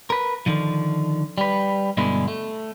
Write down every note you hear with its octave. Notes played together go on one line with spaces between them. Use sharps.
A#4 B4
D3 D#3 F3
G3 B4
G2 B2 D3 G#3 B3 E4
A3